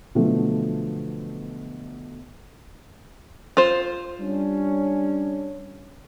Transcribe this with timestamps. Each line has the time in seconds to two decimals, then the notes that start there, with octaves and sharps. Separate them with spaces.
0.15 B2 D3 F3 F#3 A3 B3
3.57 F4 C5
4.20 G3 C#4 D4